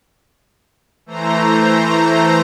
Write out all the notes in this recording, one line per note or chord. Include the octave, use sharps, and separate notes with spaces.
E3 A3 C5 A#5